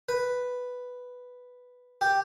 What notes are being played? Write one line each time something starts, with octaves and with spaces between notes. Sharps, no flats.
B4
G4